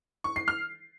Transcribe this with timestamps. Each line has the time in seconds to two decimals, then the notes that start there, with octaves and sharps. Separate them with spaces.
0.24 C#6
0.36 C7
0.48 F6